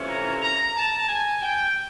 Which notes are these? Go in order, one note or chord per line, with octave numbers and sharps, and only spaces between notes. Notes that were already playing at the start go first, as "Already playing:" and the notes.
Already playing: C3 E3 A3 C#4 F4
A#5
A#5
A5
G#5
G5